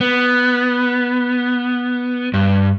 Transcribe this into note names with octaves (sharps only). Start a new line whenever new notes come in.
B3
G2